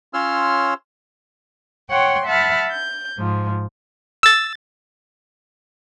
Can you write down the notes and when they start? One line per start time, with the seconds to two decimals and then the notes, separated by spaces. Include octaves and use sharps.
0.14 C#4 F4 C#5 C6 E6 F6
1.90 C#5 F#5 G5 C6
2.26 E5 F#5 A5 B5 F6
2.71 G6
3.17 G#2 F3
4.23 E6 A6